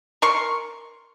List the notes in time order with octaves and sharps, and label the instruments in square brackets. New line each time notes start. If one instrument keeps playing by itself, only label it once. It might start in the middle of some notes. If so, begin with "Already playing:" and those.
[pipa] A#4 C6 C#6